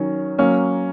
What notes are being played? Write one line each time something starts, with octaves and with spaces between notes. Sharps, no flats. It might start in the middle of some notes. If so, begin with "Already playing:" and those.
Already playing: D#3 F#3 C#4 C#5
F#3 A#3 C#4